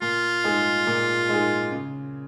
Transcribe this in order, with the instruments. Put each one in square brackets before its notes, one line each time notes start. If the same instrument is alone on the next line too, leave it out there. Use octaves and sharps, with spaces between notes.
[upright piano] A#2 [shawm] F4
[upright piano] G#3 D#4 G#4
A#2
G#3 D#4 G#4
C#3